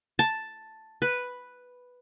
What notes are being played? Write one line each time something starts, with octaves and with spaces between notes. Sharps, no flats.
A5
B4